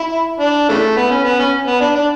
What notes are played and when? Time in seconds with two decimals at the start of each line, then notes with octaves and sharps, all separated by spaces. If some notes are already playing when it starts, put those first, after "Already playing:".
Already playing: E4
0.40 D4
0.69 C#3 E3 A3
0.97 B3
1.11 C#4
1.24 B3
1.39 C#4
1.67 B3
1.81 D4
1.95 D4